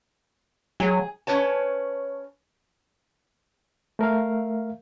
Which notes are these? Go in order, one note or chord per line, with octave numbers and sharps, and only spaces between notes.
F#3 G#4
C#4 B4 C#5 A5
A3 A#4 E5 F5